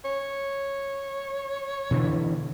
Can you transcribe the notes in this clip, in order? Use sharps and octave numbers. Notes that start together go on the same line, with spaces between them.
C#5
B2 D3 E3